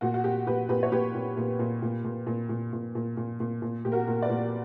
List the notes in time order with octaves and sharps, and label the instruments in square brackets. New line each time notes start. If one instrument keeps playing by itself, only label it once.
[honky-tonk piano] A#2 F#4
F#4
A#2 G4
A#2 G4 B4
A#2 G4 B4
C#5
A#2 G4 B4
A#2
A#2
A#2
A#2
A#2
A#2
A#2
A#2
A#2
A#2
A#2
A#2
A#2 G4
F#4 A#4
A#2
B4 D5
A#2